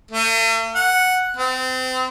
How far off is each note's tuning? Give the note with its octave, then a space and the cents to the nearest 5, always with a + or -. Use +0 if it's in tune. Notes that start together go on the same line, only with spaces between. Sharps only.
A3 +45
F#5 -5
C4 -30